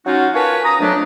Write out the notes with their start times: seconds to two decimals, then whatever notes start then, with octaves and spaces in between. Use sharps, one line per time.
0.06 F#3 C#4 D#4 F4 F#4
0.34 F4 A#4 B4 C#5 G#5 A5
0.64 A#5 D#6
0.80 F2 F#3 A3 B3 D4